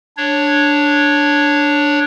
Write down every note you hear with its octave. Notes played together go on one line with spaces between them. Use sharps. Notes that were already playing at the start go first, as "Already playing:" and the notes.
D4 C#5